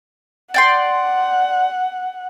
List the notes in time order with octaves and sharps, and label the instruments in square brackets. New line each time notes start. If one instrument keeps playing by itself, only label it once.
[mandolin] D5 G5 C6 [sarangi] F#5